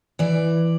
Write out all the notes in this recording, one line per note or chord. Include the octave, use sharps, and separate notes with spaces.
E3 D5